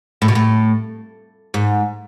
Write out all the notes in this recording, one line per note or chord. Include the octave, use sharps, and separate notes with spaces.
A2
B2
A2
G#2